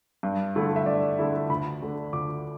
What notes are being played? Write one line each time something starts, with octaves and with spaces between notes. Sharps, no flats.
G2
D3 A3 E4
E5
G2 D5
D3 A3 E4
D2 B5
D3 A3 D4
D2 D6